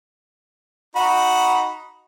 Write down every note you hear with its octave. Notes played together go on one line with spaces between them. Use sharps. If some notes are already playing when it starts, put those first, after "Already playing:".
D#4 F#4 B5